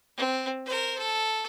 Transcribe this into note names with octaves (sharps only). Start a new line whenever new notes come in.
C4
A#4 C5
A4